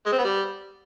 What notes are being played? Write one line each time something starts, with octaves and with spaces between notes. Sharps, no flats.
G#3
C4
B3
G3